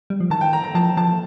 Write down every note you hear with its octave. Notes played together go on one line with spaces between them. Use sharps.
G3
F3
D#3 A5
G5
A#5
A#5
F3 A5
F3 A5